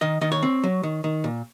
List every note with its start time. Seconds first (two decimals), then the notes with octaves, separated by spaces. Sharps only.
0.01 D#3 D#5
0.21 D#3 D#5
0.32 C#5
0.43 C4
0.64 F#3
0.83 D#3
1.04 D#3
1.24 A#2